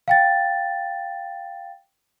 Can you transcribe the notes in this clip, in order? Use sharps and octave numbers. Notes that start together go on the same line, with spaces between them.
F5 G5 A6